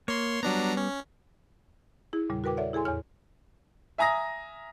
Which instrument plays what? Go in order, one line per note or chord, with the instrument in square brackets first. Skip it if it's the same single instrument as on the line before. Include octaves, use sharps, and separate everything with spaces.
[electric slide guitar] A#3 [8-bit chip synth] C#5 C6
[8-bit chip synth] F#3 D4 A#5 [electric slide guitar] G3 B3
[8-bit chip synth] C#4
[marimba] E4 G#4
E2 A#2 C#3 G3
F#4 A#4 B4 G5 D6
A4 C#5 D5 E5 F#5
E4 G#4 A4 G#5 C6
E2 A2 C#5 F6
[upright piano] E5 G#5 A#5 D#6 A#6